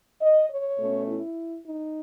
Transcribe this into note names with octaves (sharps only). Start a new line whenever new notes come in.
D#5
C#5
B2 A3 C#4
E4
D#4